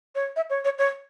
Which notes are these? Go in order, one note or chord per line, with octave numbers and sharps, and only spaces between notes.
C#5
E5
C#5
C#5
C#5